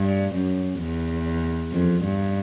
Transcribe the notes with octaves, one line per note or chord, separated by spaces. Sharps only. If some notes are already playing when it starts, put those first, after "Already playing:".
Already playing: G2
F#2
E2
F2
G2